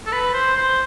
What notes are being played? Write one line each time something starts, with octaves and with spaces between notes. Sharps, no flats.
A4
B4
C5
C5